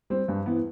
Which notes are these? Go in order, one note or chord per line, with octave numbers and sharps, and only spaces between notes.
G3 C4
G2
E3 B3